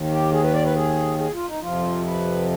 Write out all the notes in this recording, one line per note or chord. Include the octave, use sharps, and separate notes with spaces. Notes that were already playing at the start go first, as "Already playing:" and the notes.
Already playing: D#2 D#3
G4
G#4
B4
D5
B4
G#4
G#4
F4
D#4
F2 C3 F3 F4
B4